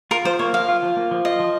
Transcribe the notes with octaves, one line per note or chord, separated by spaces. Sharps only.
F4 A#4
F3 C5
A#3 C#5
F3 F5
F4
F3
A#3
F3
F4 D#5
F3